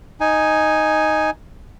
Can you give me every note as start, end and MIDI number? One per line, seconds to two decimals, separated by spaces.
0.21 1.30 63
0.21 1.30 80